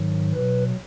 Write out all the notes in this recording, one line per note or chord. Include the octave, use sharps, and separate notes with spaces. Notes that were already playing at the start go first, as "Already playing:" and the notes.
Already playing: G#2 D#3 F#3
B2 F#3 B4